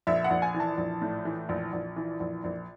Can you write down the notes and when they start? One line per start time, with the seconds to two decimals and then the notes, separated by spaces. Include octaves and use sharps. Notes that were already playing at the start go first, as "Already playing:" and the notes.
0.07 A#1 E5
0.24 F#5
0.30 A#1
0.42 G#5
0.54 E3
0.60 A5
0.78 A#1
1.01 A2
1.25 E3
1.49 A#1
1.73 A#1
1.96 E3
2.20 A#1
2.44 A#1